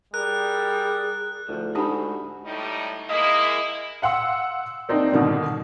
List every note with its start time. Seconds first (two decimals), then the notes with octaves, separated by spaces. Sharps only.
0.14 G3 G#4 A#4 F#6
1.48 D2 A2 F3
1.75 G#2 D4 D#4 F#4 G4 B5
2.46 A2 G3 D#4
3.10 G#3 A#3 E4 D#5
4.02 F5 F#5 C6 E6
4.89 A#3 C4 D4 D#4
5.12 G#2 B2 D3 D#3 G3